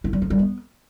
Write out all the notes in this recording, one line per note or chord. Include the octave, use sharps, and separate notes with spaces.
E4
G3
F3
G3
B3